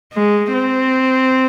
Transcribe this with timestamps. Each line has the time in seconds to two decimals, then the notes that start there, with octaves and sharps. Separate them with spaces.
0.14 G#3
0.54 C4